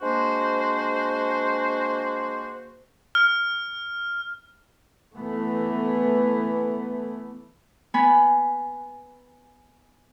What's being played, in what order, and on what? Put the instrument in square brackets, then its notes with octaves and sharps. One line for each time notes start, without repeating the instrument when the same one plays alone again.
[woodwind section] G#3 A#3 D4 F#4 C5
[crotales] F6
[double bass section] E3 A3 B3
[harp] B3 G#5 B5